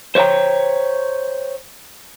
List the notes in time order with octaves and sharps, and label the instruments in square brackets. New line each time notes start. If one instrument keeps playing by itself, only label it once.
[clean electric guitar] C5 C#5 E5 G5 A#5